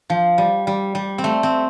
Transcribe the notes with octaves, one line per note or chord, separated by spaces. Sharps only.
F3
G3
G3
G3
C4
A3
C4